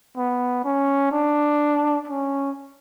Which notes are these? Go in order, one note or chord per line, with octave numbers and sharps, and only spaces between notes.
B3
C#4
D4
C#4